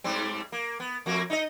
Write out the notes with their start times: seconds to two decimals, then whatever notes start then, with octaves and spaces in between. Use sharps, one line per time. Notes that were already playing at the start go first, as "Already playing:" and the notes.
0.04 G#2 G3 C4
0.52 A#3
0.80 B3
1.06 F2 A#3 F#4
1.30 D#4 E4 D#5